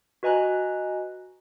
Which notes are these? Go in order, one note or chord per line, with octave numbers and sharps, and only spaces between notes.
F#4 B4 D#5 G#5 A#5 F#6